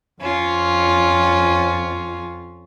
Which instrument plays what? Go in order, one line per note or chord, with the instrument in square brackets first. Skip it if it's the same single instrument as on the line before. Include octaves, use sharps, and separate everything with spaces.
[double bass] F2 [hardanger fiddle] C#4 F4